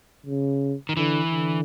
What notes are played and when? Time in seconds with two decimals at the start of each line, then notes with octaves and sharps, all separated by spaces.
0.26 C#3
0.89 D#3
0.97 D3 E3
1.31 D3